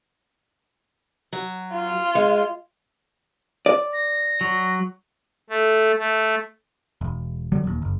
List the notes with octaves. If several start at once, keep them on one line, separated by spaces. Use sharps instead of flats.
F#3
F4
G#3
D5
A#6
F#3
A3
A3
E1
D3 F#3 G3
D#1 D#2
F#1